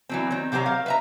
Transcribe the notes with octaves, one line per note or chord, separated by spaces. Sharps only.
E3 F#3 C4
D#3 C4
C3 F#3 G4 C5 A#5
A#4 F5
B4 E5 A#5